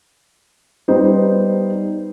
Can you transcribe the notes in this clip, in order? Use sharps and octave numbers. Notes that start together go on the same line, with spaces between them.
G3 B3 D#4 C5